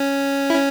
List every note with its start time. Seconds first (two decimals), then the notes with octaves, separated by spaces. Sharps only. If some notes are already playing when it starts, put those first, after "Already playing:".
Already playing: C#4
0.50 E4
0.55 C#4